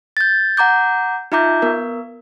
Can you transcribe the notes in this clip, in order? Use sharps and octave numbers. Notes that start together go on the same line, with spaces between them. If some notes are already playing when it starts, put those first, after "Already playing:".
G6 A6
F#5 A#5 D6 G6
D#4 F4 E5 A#5 D6 G6
B3 A#4